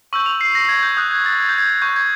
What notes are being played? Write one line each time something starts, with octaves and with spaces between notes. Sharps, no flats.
C#6 E6 G6 F#7
F7
C7
A#6
G#6
G6
D#6 F#6 G6
G#6
A6
G#6
G6
G#6
C#6 F#6 G6
G#6